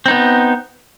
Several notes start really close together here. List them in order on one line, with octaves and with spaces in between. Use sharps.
C4 D#4 B3